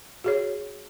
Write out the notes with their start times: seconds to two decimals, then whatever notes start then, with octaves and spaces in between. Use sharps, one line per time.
0.24 F#4 G#4 C#5